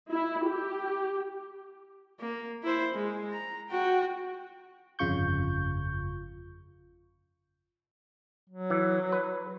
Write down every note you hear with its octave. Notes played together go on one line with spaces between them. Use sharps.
E4
G4
A#3
E4 C5
G#3
A#5
F#4 G5
G1 F2 C#3 F4 C#6 G6
F#3
E3
B4